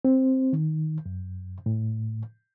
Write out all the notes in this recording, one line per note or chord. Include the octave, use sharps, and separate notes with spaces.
C4
D#3
F#2
A2